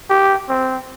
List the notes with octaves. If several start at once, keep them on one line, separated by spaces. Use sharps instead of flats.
G4
C4